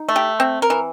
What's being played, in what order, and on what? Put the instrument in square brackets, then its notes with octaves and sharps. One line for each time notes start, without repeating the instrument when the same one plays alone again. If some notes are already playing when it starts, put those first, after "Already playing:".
Already playing: [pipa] D#4
A3
G4
C4
A#4
E3